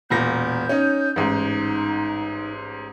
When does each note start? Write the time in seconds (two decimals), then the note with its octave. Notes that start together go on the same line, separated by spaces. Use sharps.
0.10 E1 A#2 G6 A#6
0.69 C#4 D#4
1.16 A1 G#2 D#4